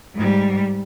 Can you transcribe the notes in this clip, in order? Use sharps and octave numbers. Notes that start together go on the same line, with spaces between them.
G#2 G3